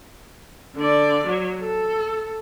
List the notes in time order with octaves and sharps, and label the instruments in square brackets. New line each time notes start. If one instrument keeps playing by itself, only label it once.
[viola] D3 D5
F#3
A4